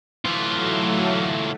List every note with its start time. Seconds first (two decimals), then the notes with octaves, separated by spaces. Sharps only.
0.25 E3 F#3 A3 F4